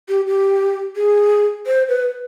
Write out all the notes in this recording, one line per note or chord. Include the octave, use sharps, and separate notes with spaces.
G4
G4
G#4
C5
B4